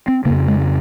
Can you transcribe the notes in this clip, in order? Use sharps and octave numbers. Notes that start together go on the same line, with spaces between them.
C4
F2 C#3 A#3
G#3